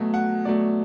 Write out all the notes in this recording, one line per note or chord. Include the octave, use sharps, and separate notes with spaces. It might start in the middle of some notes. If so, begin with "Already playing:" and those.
Already playing: B2 F#3 A3
F#5
B2 F#3 A3 D5